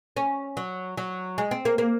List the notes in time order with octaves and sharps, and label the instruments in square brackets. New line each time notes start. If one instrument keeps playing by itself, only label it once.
[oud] C#4
F#3
F#3
G#3
C4
A#3
A#3